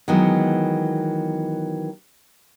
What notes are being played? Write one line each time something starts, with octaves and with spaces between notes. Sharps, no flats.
D#3 E3 F#3 G#3 B3